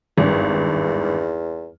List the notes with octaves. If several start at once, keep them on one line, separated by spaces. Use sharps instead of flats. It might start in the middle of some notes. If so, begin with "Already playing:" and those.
G#1 E2 G2